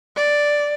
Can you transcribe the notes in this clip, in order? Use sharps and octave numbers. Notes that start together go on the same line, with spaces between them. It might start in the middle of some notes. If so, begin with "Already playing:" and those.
D5